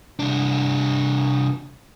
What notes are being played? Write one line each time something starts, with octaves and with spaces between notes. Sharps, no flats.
C2 D4